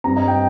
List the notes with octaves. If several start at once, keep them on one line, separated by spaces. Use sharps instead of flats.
G2 G3 C4 A#5
D#5
G5